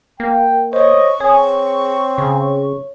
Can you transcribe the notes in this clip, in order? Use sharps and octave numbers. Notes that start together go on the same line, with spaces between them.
A#3 G5
C5 C#5 D#5 C#6
C4 G#4 C#5
C#3